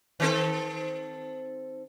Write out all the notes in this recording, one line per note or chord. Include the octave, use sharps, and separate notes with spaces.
D#3 C4 A4